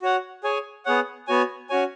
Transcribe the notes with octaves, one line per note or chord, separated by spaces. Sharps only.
F#4 C#5 F#5
G#4 C#5 G#5
B3 G#4 C#5 F#5
B3 F#4 C#5 G#5
C#4 F#4 C#5 G#5